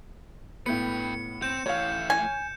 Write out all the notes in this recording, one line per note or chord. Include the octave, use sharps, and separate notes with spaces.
A2 B3 B4 G5 C#7
C4 G6 E7
A2 E3 C#5 F5
G#5